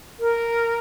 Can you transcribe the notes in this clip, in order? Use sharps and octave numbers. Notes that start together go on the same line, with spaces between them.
A#4